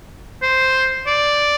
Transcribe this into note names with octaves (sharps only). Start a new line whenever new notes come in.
C5
D5